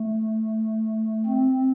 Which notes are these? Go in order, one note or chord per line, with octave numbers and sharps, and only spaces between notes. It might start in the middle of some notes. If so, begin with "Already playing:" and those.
Already playing: A3
C4